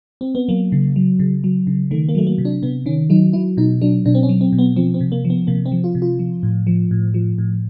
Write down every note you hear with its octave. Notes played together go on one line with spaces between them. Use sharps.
C4
B3
F#3 A#3
C#3
F#3
C#3
F#3
C#3
D#3 A3
A#3
F#3 A3
A#3
C3
D4
C3 B3
D#3 C#4
F#3 D#4
F#3 E4
B2 D#4
F#3 D4
B2 D4
C4
C#4
F#3
C4
B2
B3
F3 C4
C4
C3
A#3
F3
B3
C3 A#3
C4
F3
F4
C3
F4
F3
A2
F3
A2
F3
A2